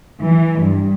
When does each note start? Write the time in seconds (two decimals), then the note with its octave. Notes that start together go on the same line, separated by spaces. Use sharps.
0.21 E3
0.60 G2